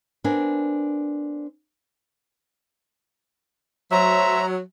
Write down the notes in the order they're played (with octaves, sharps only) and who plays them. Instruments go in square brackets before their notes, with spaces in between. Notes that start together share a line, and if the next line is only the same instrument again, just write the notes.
[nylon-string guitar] B3 C4 D4 A#4 G#5
[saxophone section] F#3 [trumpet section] A3 E5 [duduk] C5 [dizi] A#5